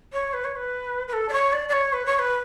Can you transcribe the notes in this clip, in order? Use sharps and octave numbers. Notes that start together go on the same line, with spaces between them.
C#5
B4
C#5
B4
B4
A4
D5
C#5
D5
D5
C#5
B4
C#5
B4